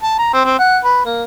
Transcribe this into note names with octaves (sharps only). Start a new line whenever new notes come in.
A5
A#5
C4
C4
F#5
B4
A#3